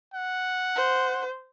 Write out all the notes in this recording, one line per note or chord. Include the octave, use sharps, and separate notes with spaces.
F#5
C5